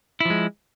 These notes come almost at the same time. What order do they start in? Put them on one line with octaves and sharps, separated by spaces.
E4 F3 G#3